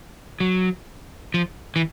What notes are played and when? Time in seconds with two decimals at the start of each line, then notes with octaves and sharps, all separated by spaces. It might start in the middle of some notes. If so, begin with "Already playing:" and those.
0.40 F#3
1.34 F3
1.76 E3